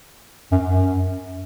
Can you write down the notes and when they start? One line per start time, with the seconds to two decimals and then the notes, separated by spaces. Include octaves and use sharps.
0.51 F#2
0.66 F#2